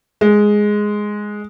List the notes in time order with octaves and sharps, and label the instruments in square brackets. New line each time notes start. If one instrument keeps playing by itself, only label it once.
[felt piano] G#3